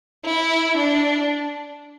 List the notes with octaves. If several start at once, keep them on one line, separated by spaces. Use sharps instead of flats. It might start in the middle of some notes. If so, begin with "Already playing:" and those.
E4
D4